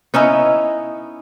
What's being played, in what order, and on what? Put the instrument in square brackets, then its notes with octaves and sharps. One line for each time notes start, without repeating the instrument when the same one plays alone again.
[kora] B3 C#4 D#4 E4